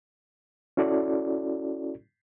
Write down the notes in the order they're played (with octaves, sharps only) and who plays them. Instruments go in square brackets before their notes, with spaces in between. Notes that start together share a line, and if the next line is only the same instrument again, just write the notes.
[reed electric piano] C#4 E4 F#4 A4 D5